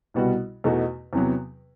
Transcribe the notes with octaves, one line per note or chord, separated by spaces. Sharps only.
C2 B2 G3 B3 F#4
E2 B2 A3 D#4 F#4
E2 C3 F#3 B3